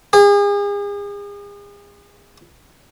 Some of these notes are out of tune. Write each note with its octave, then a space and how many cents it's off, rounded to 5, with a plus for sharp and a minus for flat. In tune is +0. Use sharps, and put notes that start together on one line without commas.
G#4 -40